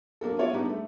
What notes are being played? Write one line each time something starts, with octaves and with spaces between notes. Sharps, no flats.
F#3 A#3 D4 A4
B3 F4 C#5 D5 E5 F5
G3 B3 D4 D#4 G4
A3